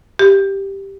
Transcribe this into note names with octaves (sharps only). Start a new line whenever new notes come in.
G4